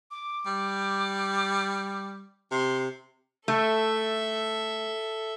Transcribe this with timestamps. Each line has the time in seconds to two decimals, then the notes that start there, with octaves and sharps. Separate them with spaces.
0.11 D6
0.46 G3
2.52 C3 C6
3.48 A3 A4 E5